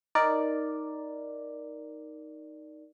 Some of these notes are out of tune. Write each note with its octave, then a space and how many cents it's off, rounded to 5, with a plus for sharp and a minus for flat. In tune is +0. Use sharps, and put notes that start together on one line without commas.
D#4 +0 A#4 +0 D5 +0